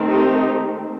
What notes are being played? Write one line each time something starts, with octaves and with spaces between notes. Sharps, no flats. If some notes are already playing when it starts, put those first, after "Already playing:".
Already playing: D#3 A3 C4
D#4 G4